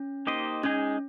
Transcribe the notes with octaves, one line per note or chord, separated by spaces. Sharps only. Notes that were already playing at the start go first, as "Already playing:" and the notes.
Already playing: C#4
A#3 D#4 G4 C5 D#5
G#3 C#4 D#4 G#4